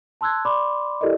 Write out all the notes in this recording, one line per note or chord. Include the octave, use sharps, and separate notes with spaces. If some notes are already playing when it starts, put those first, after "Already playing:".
A5 C6 E6 F#6 G#6
D5 B5 C6 D6
E4 G4 A4 A#4 D5 D#5